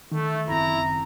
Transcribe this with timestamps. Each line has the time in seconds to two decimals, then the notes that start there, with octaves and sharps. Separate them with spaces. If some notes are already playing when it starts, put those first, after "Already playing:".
0.12 D#3 A3
0.48 F#1 C4 E4 A#5